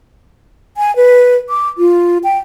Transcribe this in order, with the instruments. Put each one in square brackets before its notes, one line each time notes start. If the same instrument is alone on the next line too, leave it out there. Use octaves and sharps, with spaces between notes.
[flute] G#5
B4
D6
F4
G5